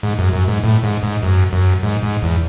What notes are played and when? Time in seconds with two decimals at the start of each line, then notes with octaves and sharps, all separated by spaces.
0.03 G#2
0.19 F#2
0.33 F#2
0.48 G#2
0.64 A2
0.83 G#2
1.03 G#2
1.23 F#2
1.53 F#2
1.83 G#2
2.03 G#2
2.23 E2